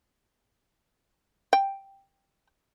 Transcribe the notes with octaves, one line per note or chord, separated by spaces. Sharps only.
G5